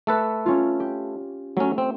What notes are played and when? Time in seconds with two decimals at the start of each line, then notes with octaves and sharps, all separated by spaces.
0.07 A3 A4 B4
0.46 C#4 F4
0.80 G4
1.57 F#3 A3 C#4
1.78 C4